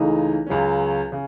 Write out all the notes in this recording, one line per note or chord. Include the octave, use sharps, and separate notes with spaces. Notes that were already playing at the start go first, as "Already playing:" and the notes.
Already playing: C#2 C#3 E3 A3 D#4
C#2 C#3 F#3 C#4
C#3